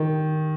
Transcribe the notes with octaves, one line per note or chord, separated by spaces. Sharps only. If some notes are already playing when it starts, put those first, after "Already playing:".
Already playing: D#3